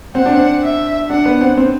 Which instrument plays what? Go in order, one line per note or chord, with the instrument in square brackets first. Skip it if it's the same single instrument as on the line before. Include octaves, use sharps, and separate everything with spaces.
[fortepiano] C4 [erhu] F#5
[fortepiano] D4
C4
[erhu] E5
[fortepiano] D4 [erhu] F#5
[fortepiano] B3
C4
C4